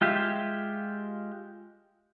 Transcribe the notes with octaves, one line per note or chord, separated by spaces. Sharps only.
G#3 F4 G4 E5